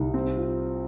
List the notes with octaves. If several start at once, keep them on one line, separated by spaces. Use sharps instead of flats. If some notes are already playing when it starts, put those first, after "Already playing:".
Already playing: C2 D#4
C4
F4